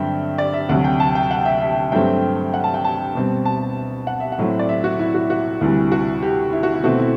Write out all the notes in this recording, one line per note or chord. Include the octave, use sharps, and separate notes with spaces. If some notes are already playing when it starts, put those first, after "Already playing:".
Already playing: G2 D3 F#3 C4 E5 G5
D5
E5
D2 C3 F#3 F#5
G5
A5
G5
F#5
E5
E5
G2 F#3 A3 C4 G5
F#5
A5
G5
A5
B2 G3 C4
A5
F#5
E5
F#5
A2 F#3 A3 C4
D5
E5
F#4
E4
F#4
F#4
D2 C3 E3 G3
F#4
G4
E4
F#4
E4
B2 A3 C4 F#4
E4